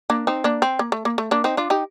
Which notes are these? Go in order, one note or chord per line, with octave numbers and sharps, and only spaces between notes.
A#3 D4
C4 D#4
A#3 D4
C4
A#3
A3
A#3
A3
A#3 D4
C4 D#4
D4 F4
D#4 G4